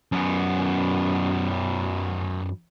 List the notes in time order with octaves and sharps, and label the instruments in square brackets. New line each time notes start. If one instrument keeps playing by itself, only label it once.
[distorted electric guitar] F#2 B3